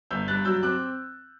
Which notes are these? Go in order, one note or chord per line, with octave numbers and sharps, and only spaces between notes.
G1 E6 G6
G2 F#6 A6
F#3 E6 G6
C4 D6 F#6